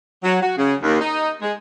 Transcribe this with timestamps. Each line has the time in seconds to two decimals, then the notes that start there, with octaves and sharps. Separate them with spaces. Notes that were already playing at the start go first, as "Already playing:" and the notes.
0.24 F#3
0.43 F#4
0.58 C#3
0.83 D#2
1.01 D#4
1.42 G#3